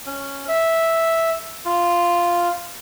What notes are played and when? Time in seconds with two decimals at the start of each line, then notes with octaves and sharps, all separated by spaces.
0.06 C#4
0.48 E5
1.65 F4